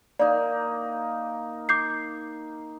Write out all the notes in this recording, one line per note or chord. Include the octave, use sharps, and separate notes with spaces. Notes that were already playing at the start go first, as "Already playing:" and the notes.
A#3 D#4 A#4 D5
D6 G6 C7